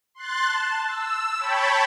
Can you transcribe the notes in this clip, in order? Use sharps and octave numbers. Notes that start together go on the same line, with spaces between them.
C6 F#6 A6
A5
E6
C#5 G5 A5 B5